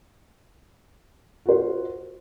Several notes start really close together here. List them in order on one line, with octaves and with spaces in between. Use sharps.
F#4 C5 F4